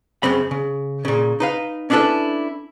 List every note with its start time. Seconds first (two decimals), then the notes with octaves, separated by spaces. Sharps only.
0.23 F#2 C#3 C4 B5
0.51 C#3
1.05 A#2 C#3
1.40 D#4 B4 F5
1.90 C#4 D4 E4 G#4 A4 B4